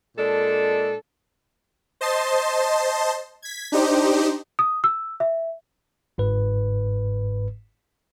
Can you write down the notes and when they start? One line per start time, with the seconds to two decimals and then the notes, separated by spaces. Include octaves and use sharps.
0.17 A#2 G#3 D4 A4
2.01 C5 D#5 A5 C6
3.42 G#6 B6
3.72 D4 D#4 G4 C5
4.59 D#6
4.84 E6
5.20 E5
6.18 G1 G#2 B4